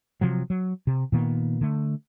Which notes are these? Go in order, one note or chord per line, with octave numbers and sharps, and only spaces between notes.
C3 F3 F#3
F#3
C3
A#2 D#3 A#3 B3
D3 A3